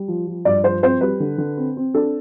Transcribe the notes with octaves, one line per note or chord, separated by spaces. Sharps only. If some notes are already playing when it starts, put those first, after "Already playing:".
Already playing: G3
F3
F3
G2 D5
F3 C5
C4 C5
G3 B4
D3
D3
C4
C4
D4 A4